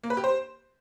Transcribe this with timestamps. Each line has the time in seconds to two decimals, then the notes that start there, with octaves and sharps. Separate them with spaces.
0.03 A#3
0.10 B4
0.17 G4
0.24 C5